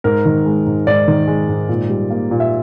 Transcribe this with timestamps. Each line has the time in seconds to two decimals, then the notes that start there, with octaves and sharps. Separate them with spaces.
0.04 G#2 A#4
0.26 D#3
0.46 G#3
0.67 G#2
0.87 G#2 D5
1.08 D#3
1.28 G#3
1.49 G#2
1.69 A#2
1.90 G3
2.10 A#3
2.31 A#2
2.40 E5